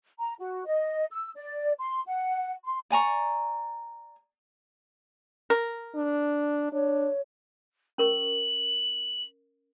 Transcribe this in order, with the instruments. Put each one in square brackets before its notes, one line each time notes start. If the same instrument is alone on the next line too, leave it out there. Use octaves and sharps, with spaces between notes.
[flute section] A#5
F#4
D#5
E6
D5
C6
F#5
C6
[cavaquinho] D5 G#5 A#5 C#6
[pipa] A#4
[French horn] D4
[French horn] D4 [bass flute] C#5
[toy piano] C#4 A#4 C#6 [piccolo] F#7